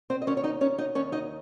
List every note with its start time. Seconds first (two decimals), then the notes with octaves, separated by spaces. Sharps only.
0.10 C4 C5
0.22 D#5
0.27 D#2 C#4 C#5
0.37 C#5
0.44 D#4 D#5
0.61 D#2 C#4 C#5
0.78 D#4 D#5
0.95 D#2 C#4 C#5
1.12 D#4 D#5